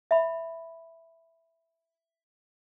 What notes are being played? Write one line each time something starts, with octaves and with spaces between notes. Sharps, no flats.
E5 B5